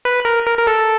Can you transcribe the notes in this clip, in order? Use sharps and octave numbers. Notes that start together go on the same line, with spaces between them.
B4
A#4
A#4
A#4
A4